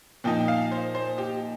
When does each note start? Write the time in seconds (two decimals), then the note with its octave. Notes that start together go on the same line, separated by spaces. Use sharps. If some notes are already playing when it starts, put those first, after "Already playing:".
0.24 A#2 F3 D#4 G5
0.48 F5
0.72 C5
0.95 C5
1.18 G4